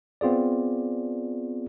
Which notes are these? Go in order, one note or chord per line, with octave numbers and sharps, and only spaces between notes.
B3 C4 F4 G#4 D5